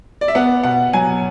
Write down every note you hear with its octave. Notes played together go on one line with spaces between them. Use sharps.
D5
E5
B3 F#5
B2 F#5
F#3 G#5